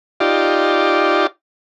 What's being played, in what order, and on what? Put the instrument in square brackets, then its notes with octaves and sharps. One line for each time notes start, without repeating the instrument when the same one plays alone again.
[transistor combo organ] D#4 F4 G4 D5